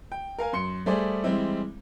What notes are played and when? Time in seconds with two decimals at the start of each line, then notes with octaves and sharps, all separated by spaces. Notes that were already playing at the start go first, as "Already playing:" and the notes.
0.12 G5
0.38 A#4 F5 G#5
0.53 F#2 C6 C#7
0.86 G3 A3 G#4 C5 D5
1.24 E3 G3 G#3 C4 E4